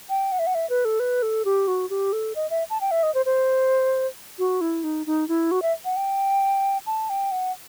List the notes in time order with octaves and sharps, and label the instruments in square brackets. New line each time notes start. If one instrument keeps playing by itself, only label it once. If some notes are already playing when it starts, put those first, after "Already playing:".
[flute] G5
F#5
E5
F#5
E5
B4
A4
B4
A4
G4
F#4
G4
A4
D#5
E5
A5
G5
E5
D#5
C5
C5
F#4
E4
D#4
D#4
E4
F#4
E5
F#5
G5
A5
G5
F#5